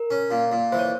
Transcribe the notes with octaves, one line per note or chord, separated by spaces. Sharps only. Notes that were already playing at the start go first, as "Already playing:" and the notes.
Already playing: A#4
C#4
A#2
A#2
E3 C5
C#5